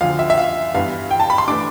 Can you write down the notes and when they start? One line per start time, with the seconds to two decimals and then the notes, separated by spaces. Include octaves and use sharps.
0.01 D2 D3 F3 F5
0.19 E5
0.30 E5
0.38 F5
0.74 G2 E3 B3 F5
1.11 G5
1.20 A5
1.30 B5
1.38 C6
1.48 E3 A3 D4 D6